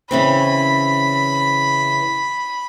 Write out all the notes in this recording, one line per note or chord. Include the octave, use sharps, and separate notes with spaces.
C#3 E3 C4 B5